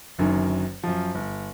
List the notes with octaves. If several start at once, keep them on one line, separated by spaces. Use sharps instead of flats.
F#1 F#2 D3 D#3
F#2 F3
G1